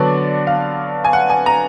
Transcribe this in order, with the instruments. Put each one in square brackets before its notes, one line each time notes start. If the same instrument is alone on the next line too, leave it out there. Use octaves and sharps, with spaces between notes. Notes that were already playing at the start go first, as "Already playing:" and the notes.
Already playing: [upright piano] D3 F#3 B3 D4 D5
F5
G#5
F#5
G#5
A#5